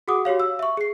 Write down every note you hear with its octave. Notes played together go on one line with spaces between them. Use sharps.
F#4 G#4 F#5 D6 D#6
F#4 G4 C#5 F5
E6
E5 C#6
G#4 C7